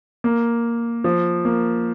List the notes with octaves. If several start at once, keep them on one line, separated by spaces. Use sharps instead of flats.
A#3
F3
A#3